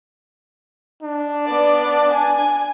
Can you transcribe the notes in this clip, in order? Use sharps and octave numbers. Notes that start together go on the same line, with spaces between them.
D4
B3 D5
G#5